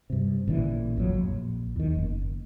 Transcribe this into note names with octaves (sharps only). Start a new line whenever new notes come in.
G2 C3
A1 A#2 D3 E3
G#1 F2 A2 F#3
A#1
E2 D#3
F#1